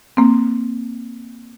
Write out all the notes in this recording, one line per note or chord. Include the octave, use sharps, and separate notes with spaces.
A#3 C4